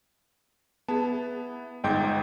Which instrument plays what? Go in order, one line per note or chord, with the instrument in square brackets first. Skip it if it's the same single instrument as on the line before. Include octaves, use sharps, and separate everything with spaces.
[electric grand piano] B3 [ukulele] E4 G#4 A5
[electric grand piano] G1 G#2 G6 [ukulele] G#4 D#5 G5